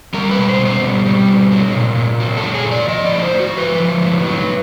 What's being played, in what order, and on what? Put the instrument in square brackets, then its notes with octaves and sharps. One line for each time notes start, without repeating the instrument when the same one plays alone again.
[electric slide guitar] G3 A#4
B4
B2
C5
B2
C5
G3
G3
B2
F#3
A#2
A#2
F#3
A4
F#3
G#4
A#2
D5
F3 D#5
D5
A2
C5
A2
F#4
F3 B4
F3
A2
F#3